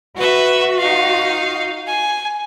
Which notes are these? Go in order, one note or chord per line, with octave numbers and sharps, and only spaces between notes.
F#4 B4 E5
D#4 F5
G#5